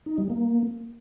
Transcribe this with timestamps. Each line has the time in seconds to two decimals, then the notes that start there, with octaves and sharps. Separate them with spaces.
0.06 D#4
0.18 G3
0.30 A#3